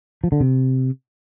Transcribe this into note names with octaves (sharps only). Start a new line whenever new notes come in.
F3
D3
C3